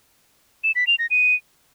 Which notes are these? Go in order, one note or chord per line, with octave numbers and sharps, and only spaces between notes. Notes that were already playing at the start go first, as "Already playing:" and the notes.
E7
B6
F7
A#6
D#7